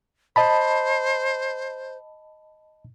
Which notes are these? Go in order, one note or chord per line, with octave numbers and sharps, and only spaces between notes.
C5 D#5 A5 B5